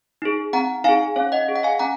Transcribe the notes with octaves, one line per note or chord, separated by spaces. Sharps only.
D#4 G#4
C4 F#5 A#5
D#4 G#4 F5 G#5
C#4 C#5 F5
D#5 F#5
G#4
F#5
F5 G#5
C#4 F#5 A#5